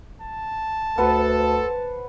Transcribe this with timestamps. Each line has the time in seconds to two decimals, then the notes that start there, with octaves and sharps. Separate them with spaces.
0.22 A5
0.98 D2 A4 B4 C5 F#5